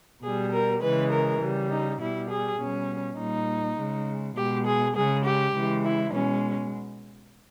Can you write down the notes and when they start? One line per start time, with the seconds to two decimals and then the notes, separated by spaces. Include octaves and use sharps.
0.23 B2 G3 G#4
0.52 A#4
0.82 C#3 E3 G#3 B4
1.12 A#4
1.41 C#3 G3
1.71 D#4
2.00 B2 G3 E4
2.30 G#4
2.59 B2 G3 C#4
3.19 A#2 G3 D#4
3.78 C#3 G#3
4.36 B2 G#3 G4
4.66 G#4
4.95 C#3 G#3 G#4
5.25 G4
5.55 C#3 E3 G#3
5.85 E4
6.13 B2 G#3 C#4